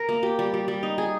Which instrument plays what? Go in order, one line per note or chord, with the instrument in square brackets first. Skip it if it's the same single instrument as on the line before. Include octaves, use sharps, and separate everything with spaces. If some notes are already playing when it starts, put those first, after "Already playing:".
Already playing: [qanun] A#4
A#3
G4
G3
G3
G3
D#4
G#4